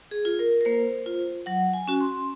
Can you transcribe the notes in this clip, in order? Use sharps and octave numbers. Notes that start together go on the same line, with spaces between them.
G#4
F4
A#4
A#4
A#3 C5
F4
F#3 F#5
G#5
C#4 F#4
C6